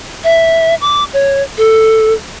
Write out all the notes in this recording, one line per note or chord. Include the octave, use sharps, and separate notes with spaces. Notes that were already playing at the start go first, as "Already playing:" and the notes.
E5
D6
C#5
A4